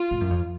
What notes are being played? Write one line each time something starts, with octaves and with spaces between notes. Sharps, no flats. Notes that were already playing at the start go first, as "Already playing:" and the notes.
Already playing: F4
G#2
F#2
F2